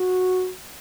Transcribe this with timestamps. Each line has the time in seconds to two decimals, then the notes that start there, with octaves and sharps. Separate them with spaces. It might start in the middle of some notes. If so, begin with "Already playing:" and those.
Already playing: F#4